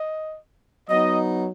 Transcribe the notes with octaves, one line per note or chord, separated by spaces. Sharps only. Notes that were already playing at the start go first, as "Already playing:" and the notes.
Already playing: D#5
F#3 B3 D#4 D#5